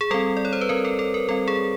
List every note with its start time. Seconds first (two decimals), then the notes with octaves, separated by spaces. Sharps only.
0.01 G#4
0.11 G3 C4 A4
0.37 D5
0.45 C#5
0.53 C5
0.61 B4
0.69 G3 C4 A#4
0.85 A4
0.99 A4
1.14 A#4
1.29 G3 C4 A4
1.48 G#4